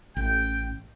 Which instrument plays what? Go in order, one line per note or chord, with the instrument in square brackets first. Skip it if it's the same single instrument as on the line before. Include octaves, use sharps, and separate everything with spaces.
[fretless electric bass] A1 [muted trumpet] G5